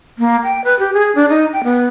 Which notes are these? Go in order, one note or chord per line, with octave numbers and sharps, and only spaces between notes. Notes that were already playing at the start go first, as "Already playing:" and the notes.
A#3
G5
B4
G4
G#4
D4
D#4
G5
B3